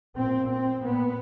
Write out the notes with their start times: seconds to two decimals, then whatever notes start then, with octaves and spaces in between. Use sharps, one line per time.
0.16 A#2 C4
0.50 C4
0.83 A#2 B3